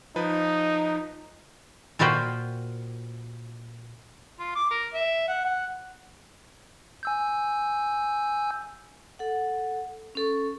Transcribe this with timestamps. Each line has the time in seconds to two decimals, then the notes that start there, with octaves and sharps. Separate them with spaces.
0.16 F3 D#4 B4
1.99 A#2 F4 F#4 B4 C5 G5
4.39 F4
4.56 D6
4.71 A#4
4.93 E5
5.28 F#5
5.45 F#5
7.03 G#5 E6 G6
9.19 A4 F#5
10.15 C#4 A4 C#6